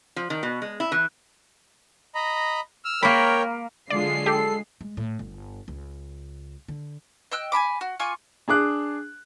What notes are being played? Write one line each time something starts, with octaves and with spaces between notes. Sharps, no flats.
F3
D#3
B2
G#3
E4
E3
D#5 A#5 B5
E6 F6
A#3 A#4 C#5 G5 B5
D3 F#3 G#3 F4 D5 C7
G4 A4
G#3
A2
G1
C#2
D3
D#5 G5 E6 F#6
G#5 A5 B5 D6
F#4
F4 G#5 C#6 D6
D4 G#4 D6 F#6